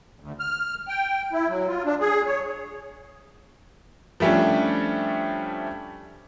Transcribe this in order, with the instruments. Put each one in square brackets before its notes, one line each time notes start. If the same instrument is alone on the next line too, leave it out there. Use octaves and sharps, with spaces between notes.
[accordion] D2
F6
G5
E4
F#3
F4
D4
G#4
C#5
[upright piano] F3 G3 A3 C#4 D4